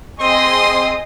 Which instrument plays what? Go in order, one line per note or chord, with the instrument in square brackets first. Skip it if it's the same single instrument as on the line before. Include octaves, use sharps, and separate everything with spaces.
[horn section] C4 C6 [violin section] G#4 D#5 D#6